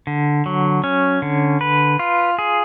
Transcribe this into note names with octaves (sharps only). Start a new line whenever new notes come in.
D3
F#3
C#4
D3
B4
F4
G#4